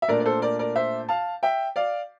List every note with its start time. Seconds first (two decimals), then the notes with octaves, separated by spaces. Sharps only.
0.02 E5
0.08 A#2 A3 D4 A#4 D5
0.20 D5
0.25 A4 C5
0.42 A#4 D5
0.59 A#4 D5
0.76 C5 E5
1.09 F5 A5
1.43 E5 G5
1.76 D5 F5